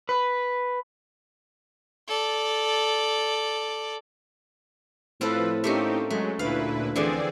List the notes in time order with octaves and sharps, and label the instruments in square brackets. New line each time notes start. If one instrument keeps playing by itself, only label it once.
[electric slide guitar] B4
[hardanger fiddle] A4 D5
[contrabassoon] A2 [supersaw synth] F3 B4 [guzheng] C4 F4 A4
[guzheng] A3 A#3 C#4 [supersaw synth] C4 D#4 G4
[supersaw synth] F#3 G#3 [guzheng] A3
[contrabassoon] D2 [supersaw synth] A#2 E4 B4 [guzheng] F5
[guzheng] D3 E3 F3 [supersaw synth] C4 G#4 D5